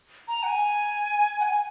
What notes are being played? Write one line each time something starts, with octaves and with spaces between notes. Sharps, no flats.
A#5
F#5
G#5
F#5
G#5